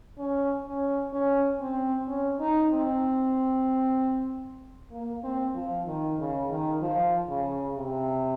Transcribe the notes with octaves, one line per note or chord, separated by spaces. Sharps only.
C#4
C#4
C#4
C4
C#4
D#4
C4
A#3
C4
F3
D#3
C#3
D#3
F3
C#3
C3